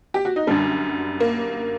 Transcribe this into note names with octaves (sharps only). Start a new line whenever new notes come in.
G4
F#4
D#4
F#2 D3 G3 D4
A#3